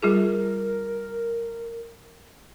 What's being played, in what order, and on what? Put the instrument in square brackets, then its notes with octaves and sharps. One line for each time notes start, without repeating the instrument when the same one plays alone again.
[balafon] G3 F4 G#4 [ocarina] A#4